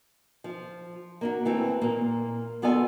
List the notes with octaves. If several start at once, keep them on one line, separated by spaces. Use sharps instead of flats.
F3
A#3 D4 F#4
E3 A3 C4
A#2 A#3
D2 B3 F4 A4 D5 G#5